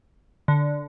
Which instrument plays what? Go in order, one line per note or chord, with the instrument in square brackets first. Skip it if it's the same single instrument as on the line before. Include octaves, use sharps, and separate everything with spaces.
[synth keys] D3